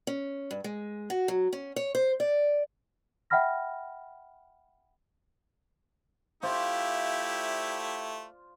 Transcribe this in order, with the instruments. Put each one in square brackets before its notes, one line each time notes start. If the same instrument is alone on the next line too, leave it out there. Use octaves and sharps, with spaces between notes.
[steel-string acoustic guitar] C#4
G2
G#3
F#4
F#3
C#4
C#5
C5
D5
[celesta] E5 F#5 G5 B5 F6 A#6
[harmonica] A3 E4 G4 [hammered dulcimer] F4 C5 D5